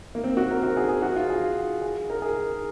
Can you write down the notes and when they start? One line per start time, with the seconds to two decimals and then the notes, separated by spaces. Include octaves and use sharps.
0.15 A#3
0.24 C4
0.37 F#4
0.51 A#4
0.63 F#4
0.77 G#4
0.89 G#4
1.02 F#4
1.16 F4
1.30 G#4
1.81 G#4
2.10 A#4
2.22 G#4